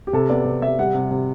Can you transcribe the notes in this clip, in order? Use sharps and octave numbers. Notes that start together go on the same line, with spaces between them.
G4
C3 A4
B3 D5
C3
C3 E5
G3 F#5
C3
C3